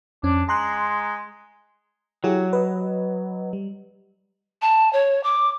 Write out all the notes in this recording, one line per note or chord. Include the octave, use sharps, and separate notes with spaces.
F2 C#4 D4
G#3 A#5 C6 F#6
F#3 E4 G4 G#4
B4 D#5
G3
A5
C#5
D6